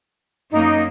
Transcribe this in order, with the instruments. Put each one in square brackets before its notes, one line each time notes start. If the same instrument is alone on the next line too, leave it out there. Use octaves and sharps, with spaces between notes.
[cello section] F#2 A#3 [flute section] D#4